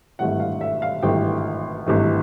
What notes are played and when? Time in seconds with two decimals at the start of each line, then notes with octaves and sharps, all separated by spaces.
0.19 G#1 G2 E3 A3 F#5
0.40 F5
0.61 E5
0.82 F5
1.03 G#1 G2 E3 A3 G5
1.86 G#1 G2 E3 A3